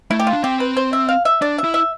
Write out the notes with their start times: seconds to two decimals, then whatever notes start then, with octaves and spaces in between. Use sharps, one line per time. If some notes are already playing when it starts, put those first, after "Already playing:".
0.11 A3 E4
0.19 G4
0.27 F4
0.33 D4
0.44 C4 G4
0.60 B4
0.77 C5
0.93 E5
1.09 F5
1.25 E5
1.42 D4 D5
1.58 E5
1.64 E4
1.74 E5